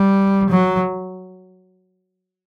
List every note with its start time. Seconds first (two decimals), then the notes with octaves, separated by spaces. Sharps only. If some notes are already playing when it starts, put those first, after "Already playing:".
Already playing: G3
0.50 F#3